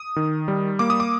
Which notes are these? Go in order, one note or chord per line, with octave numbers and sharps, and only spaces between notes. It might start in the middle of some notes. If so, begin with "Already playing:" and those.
Already playing: D#6
D#3
G3
A#3 D6
D#6
D6